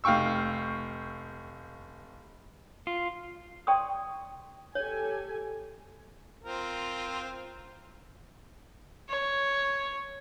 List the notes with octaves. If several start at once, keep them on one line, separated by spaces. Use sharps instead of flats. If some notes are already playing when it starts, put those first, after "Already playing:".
F1 F5 G5 C#6 E6
F4
D5 G5 A5 C6 C#6 D#6
G4 A4 C#5 G#5
C4 F4 A#4
C#5